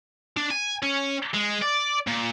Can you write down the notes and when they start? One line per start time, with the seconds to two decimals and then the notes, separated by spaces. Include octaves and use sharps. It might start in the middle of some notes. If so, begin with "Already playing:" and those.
0.37 D4
0.50 G#5
0.83 C#4
1.34 G#3
1.62 D5
2.07 A#2